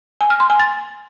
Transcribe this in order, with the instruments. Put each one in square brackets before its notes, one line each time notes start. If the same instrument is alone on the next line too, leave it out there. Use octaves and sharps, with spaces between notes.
[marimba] G#5
F6
C6
G#5
A6